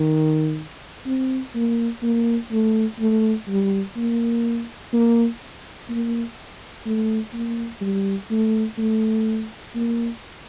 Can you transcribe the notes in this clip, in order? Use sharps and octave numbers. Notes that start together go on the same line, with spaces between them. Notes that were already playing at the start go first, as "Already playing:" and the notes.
Already playing: D#3
C4
A#3
A#3
A3
A3
G3
A#3
A#3
A#3
A3
A#3
G3
A3
A3
A#3